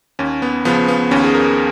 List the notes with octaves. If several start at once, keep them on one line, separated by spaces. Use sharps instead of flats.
D#2 C#4
B3
C#3 F3 B3
B3
D#2 C#4
G#4
A#4